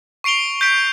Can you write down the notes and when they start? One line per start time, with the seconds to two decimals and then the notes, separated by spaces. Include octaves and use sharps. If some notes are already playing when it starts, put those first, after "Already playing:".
0.24 C#6 C7 D7 F7 G7
0.61 G6 B6 D7